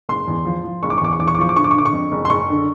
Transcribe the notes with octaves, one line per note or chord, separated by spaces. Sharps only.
F#1 C6
E2
F3
F3
F#1 C#6
D6
C#6
E2 D6
C#6
E2 D6
C#6
D6
F3 C#6
D6
D3 C#6
D6
C#6
D3 D6
C#6
F2
F#1
C6
F#1 C#6
D3